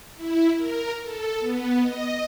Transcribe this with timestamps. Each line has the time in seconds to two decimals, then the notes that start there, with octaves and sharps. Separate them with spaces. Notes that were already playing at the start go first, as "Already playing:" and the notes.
0.15 E4
0.57 A#4
1.03 A4
1.39 B3
1.81 D#5